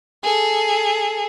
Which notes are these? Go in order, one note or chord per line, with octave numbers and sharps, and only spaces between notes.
G#4 A4